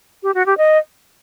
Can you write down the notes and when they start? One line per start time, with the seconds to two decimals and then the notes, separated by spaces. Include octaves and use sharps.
0.23 G4
0.34 F#4
0.46 G4
0.58 D#5